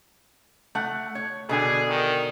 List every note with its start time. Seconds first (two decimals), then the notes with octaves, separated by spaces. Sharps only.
0.75 A3 F#5
1.15 C#5
1.49 B2 D3 G#4 G#5
1.89 D#3